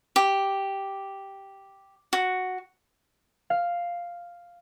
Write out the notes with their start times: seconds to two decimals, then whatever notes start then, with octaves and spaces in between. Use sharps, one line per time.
0.16 G4
2.13 F#4
3.50 F5